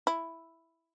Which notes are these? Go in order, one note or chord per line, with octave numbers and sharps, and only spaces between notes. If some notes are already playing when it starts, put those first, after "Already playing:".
E4